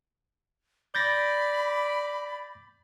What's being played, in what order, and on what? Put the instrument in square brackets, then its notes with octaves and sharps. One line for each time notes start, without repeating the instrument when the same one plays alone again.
[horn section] D5 [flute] B5 [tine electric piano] G6 A6 A#6